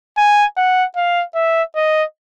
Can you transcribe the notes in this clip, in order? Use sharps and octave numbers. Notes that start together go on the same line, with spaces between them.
G#5
F#5
F5
E5
D#5